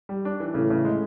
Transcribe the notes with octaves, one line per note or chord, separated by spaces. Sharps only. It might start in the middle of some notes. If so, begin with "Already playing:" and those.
G3
D4
E3
A2 C#3
C#3
G#3